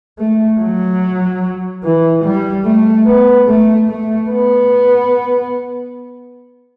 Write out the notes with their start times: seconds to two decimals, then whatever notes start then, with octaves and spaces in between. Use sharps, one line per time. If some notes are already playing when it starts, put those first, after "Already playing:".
0.19 A3
0.61 F#3
1.84 E3
2.24 G3
2.65 A3
3.06 B3
3.47 A3
3.88 A3
4.30 B3